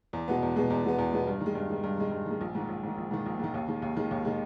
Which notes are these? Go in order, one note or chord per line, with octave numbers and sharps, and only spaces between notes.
E2
B2 G#3 B3
E2
B2 G#3 B3
E2
B2 G#3 B3
E2
B2 G#3 B3
G2
D#3
G#3
G2
D#3 G#3
G2
D#3 G#3
G2
D#3 G#3
A#1
G#2 D#3
A#1
G#2 D#3
A#1
G#2 D#3
A#1
G#2 D#3
D#2
D#3 G#3
D#2
D#3 G#3
D#2
D#3 G#3